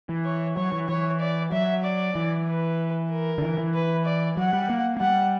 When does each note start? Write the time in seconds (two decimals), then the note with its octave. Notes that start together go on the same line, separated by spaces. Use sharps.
0.09 E3
0.25 C#5
0.56 F#3 C#5
0.72 E3
0.89 E3 C#5
1.20 D5
1.52 F#3 E5
1.84 D5
2.15 E3
2.47 B4
3.10 A#4
3.38 D3
3.42 E3
3.58 E3
3.74 B4
4.05 D5
4.37 F#3 F#5
4.53 G3
4.70 A#3
4.97 A#3
5.01 G3 F#5